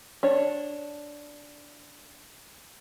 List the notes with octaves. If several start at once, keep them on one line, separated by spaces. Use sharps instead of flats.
D4 C#5